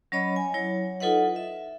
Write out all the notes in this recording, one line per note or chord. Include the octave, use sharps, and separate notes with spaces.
F#3 C#4 C#5 D#5 B5
G#5
F#3 E4 C#5
D#4 F4 A4 B4 D#5 F#5
E5